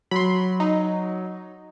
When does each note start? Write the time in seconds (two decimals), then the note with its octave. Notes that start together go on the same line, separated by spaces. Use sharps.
0.11 F#3 B5 C6
0.60 D#4